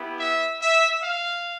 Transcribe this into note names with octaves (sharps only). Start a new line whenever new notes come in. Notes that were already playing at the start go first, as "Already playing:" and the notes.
Already playing: B3 E4 G4
E5
E5
F5